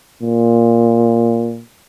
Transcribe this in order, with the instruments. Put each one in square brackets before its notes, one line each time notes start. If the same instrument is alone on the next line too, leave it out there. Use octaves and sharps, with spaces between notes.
[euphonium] A#2